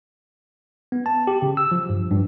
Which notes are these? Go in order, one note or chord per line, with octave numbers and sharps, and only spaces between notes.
B3
A5
G4
C#3
E6
F3
G2
G2